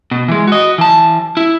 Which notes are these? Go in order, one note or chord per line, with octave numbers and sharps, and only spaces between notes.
B2
E3 G#3
F#4 D#5
E3 A5
E4